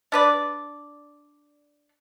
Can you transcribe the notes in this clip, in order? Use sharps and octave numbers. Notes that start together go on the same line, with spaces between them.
D4 B4 D5